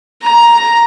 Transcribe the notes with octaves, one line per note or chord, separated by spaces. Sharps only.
A#5